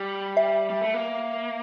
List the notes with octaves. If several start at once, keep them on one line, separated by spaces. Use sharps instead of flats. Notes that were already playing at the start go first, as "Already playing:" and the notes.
Already playing: G3
E5
G3
A3
A#3